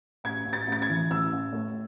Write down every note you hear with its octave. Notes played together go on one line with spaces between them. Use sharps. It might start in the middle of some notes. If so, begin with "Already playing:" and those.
A1 G#6
A1
A6
A1 A6
G#6
E3
A1 E6
A1
A2